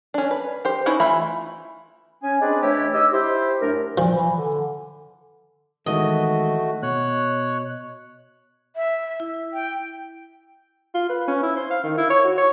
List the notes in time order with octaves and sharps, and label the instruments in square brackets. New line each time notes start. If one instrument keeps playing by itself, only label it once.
[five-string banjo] C#4 D4
B4
G4 C5
C#4 D#4 E4 B4
E3 A3 F4 E5 B5
[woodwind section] C#4 G#5
C4 D4 G#4 B4 D5 D#5
E3 A3 D4 E4 G4 C#5
D#4 G4 D#5 E6
E4 G4 C5
F#2 A3 D4 A#4
[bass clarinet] A#2 [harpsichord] F3
[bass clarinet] E3
D3
[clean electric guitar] D#3 E3 G#3 [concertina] A3 F#4 [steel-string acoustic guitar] D#5
[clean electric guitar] B2 [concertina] C#5 F#6
[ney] E5
[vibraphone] E4
[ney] G5
[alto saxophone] F4
B4
C#4
E4
C5
F5
D#3
E4
C#5
F#4
C#5